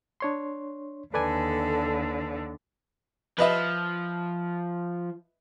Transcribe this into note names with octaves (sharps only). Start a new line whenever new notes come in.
D4 C#5 C6
D#2 D3 A4 B4 D5 G#5
F3 B4 D#5 E5